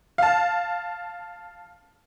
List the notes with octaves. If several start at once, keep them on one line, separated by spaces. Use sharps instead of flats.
F5 A5